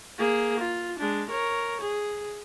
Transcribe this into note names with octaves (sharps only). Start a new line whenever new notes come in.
A#3 G#4
F4
G#3 D4
A#4 C#5
G#4